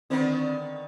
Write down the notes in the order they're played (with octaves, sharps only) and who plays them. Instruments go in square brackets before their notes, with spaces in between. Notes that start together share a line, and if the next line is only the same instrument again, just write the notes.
[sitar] D3 D#3 B3 [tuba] C4